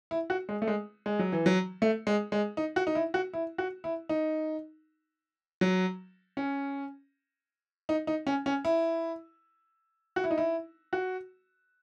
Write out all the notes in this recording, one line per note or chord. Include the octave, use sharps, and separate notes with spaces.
E4
F#4
G#3
A3
G#3
G#3
F#3
E3
F#3
A3
G#3
G#3
D#4
F#4
D#4
E4
F#4
E4
F#4
E4
D#4
F#3
C#4
D#4
D#4
C#4
C#4
E4
F#4
E4
D#4
E4
F#4